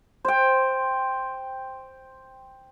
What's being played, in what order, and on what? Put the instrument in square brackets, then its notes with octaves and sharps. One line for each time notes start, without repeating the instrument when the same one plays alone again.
[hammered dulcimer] C5 G5